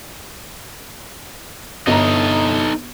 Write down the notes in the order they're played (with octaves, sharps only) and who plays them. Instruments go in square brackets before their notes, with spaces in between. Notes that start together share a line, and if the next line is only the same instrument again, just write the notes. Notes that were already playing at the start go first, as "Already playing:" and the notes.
[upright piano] G1 A#5 [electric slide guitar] D#4 A4 D#5